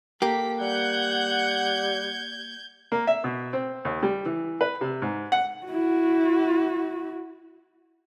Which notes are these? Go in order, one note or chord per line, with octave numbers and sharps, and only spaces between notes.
A#3 G4 A4 B6
G3 F#5 G6 G#6
A#3
E5
B2
C4
D#2
G3
E3
B4
C3
G#2
F#5
E4 F#4